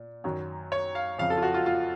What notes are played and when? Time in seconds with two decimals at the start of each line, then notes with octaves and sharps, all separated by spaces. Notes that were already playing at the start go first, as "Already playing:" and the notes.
Already playing: A#2
0.24 F#2 D#3 F#3
0.72 C#5
0.95 F5
1.18 F2 C#3 F3 F5
1.30 A4
1.37 F4
1.42 F#4
1.54 F4
1.66 F4